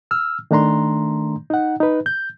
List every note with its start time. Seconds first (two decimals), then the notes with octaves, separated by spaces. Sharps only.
0.11 E6 F6
0.51 D#3 A3 D4 A#5 C6
1.50 D#4 F#5
1.80 D#4 B4
2.06 G6